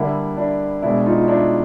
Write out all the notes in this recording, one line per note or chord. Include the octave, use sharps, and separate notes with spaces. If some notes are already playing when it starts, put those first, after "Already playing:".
Already playing: D3 G3 A#3 D4 E4
D4 E4
B2 G#3 D4 E4
D#4 F4
D4 E4